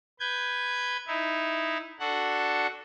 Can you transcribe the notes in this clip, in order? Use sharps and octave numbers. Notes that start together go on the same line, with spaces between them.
B4 G6 G#6
D#4 E4
D4 F#4 A4 F#5